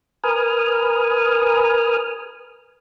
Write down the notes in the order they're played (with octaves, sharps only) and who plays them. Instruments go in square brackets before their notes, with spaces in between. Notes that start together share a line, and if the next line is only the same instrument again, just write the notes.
[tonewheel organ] A#4 B4 G#5 D#6 F6